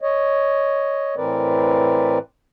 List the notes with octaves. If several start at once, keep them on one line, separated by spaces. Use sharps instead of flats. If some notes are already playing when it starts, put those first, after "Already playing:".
C#5 D#5
A2 E3 C4 A#4 B4 D5